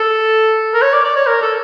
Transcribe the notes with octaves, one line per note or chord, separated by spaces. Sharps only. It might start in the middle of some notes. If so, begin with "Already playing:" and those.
Already playing: A4
A#4
C#5
D5
D5
C#5
A#4
A4